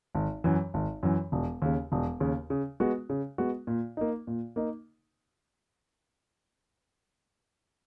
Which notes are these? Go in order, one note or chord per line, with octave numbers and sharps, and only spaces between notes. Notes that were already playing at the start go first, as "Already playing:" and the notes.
G#1
F#2 E3
G#1
F#2 E3
E1
D#2 C#3
E1
D#2 C#3
C#3
G#3 B3 F#4
C#3
G#3 B3 F#4
A#2
A#3 D#4
A#2
A#3 D#4